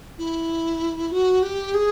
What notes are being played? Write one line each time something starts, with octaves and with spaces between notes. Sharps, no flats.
E4
F#4
G4
G#4